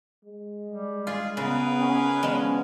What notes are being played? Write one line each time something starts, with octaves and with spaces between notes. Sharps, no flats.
G#3
G3
F4 G#4
C#3 B3 G#4 A#4 B4
C#4
F3 G#3 B3 C#4